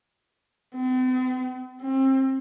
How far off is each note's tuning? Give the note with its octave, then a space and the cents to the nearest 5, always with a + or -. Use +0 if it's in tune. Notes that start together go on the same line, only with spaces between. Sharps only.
C4 -45
C4 +30